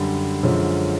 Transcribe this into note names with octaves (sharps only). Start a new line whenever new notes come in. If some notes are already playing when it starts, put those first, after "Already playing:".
Already playing: F#2 D3 G3
F#2 D3 F3 G#3 C#4